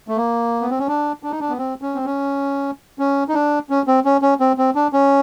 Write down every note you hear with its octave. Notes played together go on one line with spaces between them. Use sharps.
A3
A#3
B3
C4
C#4
D4
D4
D#4
D4
B3
C4
C#4
C4
C#4
C#4
D#4
D4
C#4
C4
C#4
C#4
C4
C4
D4
C#4